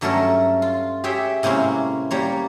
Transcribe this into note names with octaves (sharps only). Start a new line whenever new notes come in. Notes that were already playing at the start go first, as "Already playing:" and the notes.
G2 F#3 A3 C#4 A4 A#4
F4
G4 G#4 C#5 E5 G5
A2 C3 G#3 A#3 C#4
G3 A#3 C#5